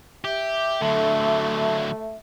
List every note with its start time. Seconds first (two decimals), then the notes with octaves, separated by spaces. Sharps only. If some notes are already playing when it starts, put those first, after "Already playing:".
0.24 G4 E5
0.82 D3 F#3 A3